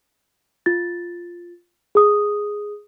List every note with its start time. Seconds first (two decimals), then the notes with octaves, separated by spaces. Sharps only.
0.66 F4 A6
1.95 G#4 D#6